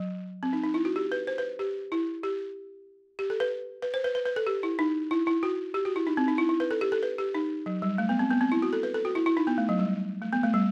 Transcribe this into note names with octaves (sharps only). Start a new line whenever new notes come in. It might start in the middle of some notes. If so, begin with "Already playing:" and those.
Already playing: F#3
C4
D#4
D#4
E4
F#4
G4
B4
C5
B4
G4
E4
G4
G4
A4
B4
B4
C5
B4
B4
B4
A4
G4
E4
D#4
E4
E4
F#4
G4
F#4
E4
D#4
C4
D#4
E4
E4
B4
A4
G4
A4
B4
G4
D#4
F#3
G3
A3
B3
C4
B3
C4
E4
F#4
A4
B4
A4
F#4
E4
E4
D#4
B3
A3
F#3
G3
A3
B3
A3
G3